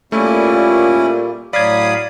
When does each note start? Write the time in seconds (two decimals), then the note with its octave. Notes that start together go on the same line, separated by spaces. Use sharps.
0.12 A#2 G3 A3 A#3 C#4 E4
1.53 A2 F#3 D5 F5 B5 D#6 G#6